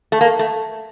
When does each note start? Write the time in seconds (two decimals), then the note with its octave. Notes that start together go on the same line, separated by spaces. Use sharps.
0.12 A3
0.21 A#3
0.39 A3